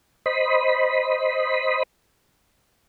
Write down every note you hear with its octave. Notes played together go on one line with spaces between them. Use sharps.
C5 D#5 B5